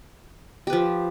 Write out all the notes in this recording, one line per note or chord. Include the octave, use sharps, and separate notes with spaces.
F3 G4 B4